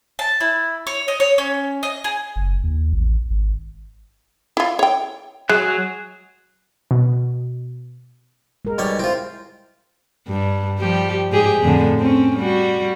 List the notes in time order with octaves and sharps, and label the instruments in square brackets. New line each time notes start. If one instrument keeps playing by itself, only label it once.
[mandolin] A5
E4
C#5
D#5
C#5
C#4
D#5
G#4
[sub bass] F#1
D#2
A1
G#1
[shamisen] E4 F4
C#5 G5
[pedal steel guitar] F#3 G#4 F#6 [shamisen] G#3
[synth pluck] B2
[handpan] G#3 A#4
[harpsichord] B1 G3 C#5
[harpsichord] C4 F4 [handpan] E4 C5
[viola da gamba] G2
F3 G3 G4
G#2 G4 G#4
F2 A2 D3
C4 C#4
G3 F#4